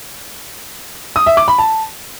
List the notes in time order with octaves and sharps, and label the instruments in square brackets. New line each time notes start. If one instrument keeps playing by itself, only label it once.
[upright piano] D#6
E5
D6
B5
A5